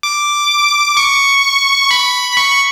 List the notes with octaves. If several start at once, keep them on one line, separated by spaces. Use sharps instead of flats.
D6
C#6
B5
C#6